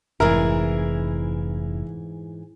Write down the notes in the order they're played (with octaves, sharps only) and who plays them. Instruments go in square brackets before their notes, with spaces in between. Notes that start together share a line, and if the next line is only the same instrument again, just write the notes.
[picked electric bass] F1 [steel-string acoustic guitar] G#2 E3 G#4 [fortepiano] E4 A#4